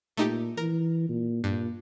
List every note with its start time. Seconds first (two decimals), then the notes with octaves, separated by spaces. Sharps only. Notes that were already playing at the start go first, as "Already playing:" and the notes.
0.17 A#2 A3 D#4 G4
0.57 E3 A#4
1.09 A#2
1.44 G2 A#2